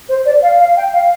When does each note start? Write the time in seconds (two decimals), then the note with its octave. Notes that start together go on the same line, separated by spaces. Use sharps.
0.09 C5
0.26 D5
0.42 F5
0.59 F5
0.77 G5
0.93 F5